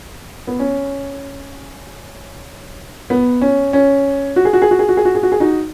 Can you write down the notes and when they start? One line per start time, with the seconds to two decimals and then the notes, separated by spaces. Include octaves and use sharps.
0.47 B3
0.60 C#4
3.10 B3
3.42 C#4
3.73 C#4
4.36 F#4
4.45 G#4
4.53 F#4
4.62 G#4
4.71 F#4
4.79 G#4
4.89 F#4
4.97 G#4
5.05 F#4
5.15 G#4
5.23 F#4
5.32 G#4
5.40 D#4 F#4